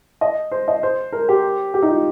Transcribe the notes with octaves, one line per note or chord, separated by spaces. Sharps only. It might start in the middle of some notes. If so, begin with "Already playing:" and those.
D#5
C5
D#5
C5
A#4
G4
G4
D#4
F4